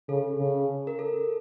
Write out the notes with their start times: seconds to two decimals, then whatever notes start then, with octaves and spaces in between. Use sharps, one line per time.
0.09 C#3 A4
0.39 C#3
0.87 A#4
0.99 A4